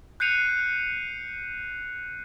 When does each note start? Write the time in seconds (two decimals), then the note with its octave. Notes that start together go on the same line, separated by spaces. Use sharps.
0.20 F#6 G6 C7 C#7 D#7 F7